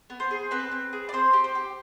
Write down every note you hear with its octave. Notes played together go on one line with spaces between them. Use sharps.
B3
C5
G#4
C4 B4
C4
G#4
D5
C4 C5
G4
C5
G4